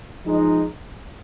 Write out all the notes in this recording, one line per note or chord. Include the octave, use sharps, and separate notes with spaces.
F3 G#3 D#4